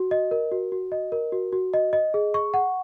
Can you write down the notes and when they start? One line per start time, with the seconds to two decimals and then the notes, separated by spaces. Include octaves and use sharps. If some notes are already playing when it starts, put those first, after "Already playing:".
Already playing: F#4
0.11 D#5
0.31 A#4
0.51 F#4
0.72 F#4
0.92 D#5
1.12 A#4
1.32 F#4
1.52 F#4
1.73 D#5
1.93 D#5
2.14 G#4
2.34 C#6
2.54 F#5